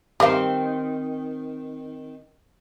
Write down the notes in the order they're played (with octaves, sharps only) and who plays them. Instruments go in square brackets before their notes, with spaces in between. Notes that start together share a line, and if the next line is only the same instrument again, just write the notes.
[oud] D#3 C4 [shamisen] G4 A#4 F5